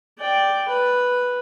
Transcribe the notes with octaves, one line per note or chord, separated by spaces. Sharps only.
D5 G5
B4